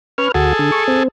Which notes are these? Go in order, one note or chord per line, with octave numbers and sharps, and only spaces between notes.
C#4 B4 F6
D2 F#4 G#4 A4
D3
C#6
C4